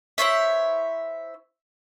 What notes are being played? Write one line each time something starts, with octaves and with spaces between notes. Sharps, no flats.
E4 C5 C#5 E5